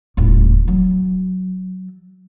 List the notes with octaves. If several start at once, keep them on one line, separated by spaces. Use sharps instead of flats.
D#1 A2
F#3